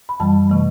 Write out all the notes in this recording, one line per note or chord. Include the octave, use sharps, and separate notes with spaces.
B5
F#2 E3 G3 A5
C3 E3 A3